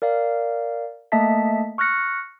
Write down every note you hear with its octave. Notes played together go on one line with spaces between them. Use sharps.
A#4 D5 F5
A3 A#3 D#5 E5 A5 B6
C#6 F6 F#6 A#6 C#7